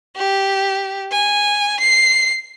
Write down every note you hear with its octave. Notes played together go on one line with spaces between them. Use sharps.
G4
G#5
C7